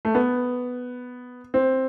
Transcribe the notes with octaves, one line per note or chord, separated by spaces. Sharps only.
A3
B3
C4